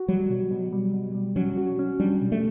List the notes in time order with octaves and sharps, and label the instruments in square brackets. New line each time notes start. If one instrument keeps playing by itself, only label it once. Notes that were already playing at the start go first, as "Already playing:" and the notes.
Already playing: [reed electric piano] F#4
[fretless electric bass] F#3 [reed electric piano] G3
[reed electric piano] B2
B2
G3
B2
G3
[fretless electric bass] F#3 [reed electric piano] C#4
[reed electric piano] F#4
C#4
[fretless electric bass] G3 [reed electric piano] D4
[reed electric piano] B2
[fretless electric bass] A3